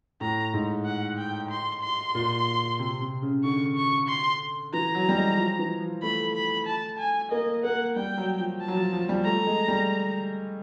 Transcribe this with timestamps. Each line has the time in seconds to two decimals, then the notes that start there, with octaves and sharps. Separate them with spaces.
0.21 A2 A#5
0.54 G#2
0.85 F#5
1.18 G5
1.50 C6
1.83 C6
2.15 A#2
2.79 C3
3.01 C3
3.22 C#3
3.44 D3 C#6
3.76 C#6
4.08 C6
4.73 E3 A#5
4.95 F#3
5.09 G3
5.16 G#3
5.38 F3
5.59 E3
5.80 F3
6.02 A3 B5
6.35 B5
6.67 A5
6.99 G#5
7.31 A#3 D#5
7.64 A#3 F#5
7.96 G3 G5
8.18 F#3
8.39 F3
8.61 A5
8.68 F#3
8.76 F3
8.93 F3
9.09 G3
9.25 A3 A#5
9.47 G#3
9.68 G3